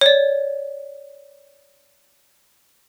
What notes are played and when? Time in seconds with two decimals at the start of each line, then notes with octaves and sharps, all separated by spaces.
0.01 C#5 D5